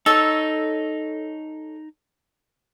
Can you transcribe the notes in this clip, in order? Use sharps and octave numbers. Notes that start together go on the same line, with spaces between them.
D#4 A4 C#5 E6